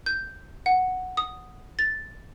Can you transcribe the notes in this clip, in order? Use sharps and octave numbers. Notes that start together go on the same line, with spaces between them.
G6
F#5
D#6
A6